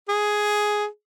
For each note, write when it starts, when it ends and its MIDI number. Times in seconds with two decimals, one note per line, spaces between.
0.09 0.86 68